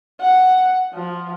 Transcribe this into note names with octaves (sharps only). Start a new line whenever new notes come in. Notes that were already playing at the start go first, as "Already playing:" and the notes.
F#5
F3